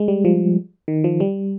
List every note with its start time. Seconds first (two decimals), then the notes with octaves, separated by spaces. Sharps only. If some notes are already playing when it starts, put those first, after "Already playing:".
Already playing: G#3
0.08 G3
0.25 F3
0.88 D#3
1.04 F3
1.20 G3